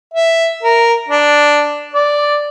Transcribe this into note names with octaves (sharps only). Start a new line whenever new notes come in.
E5
A#4
D4
D5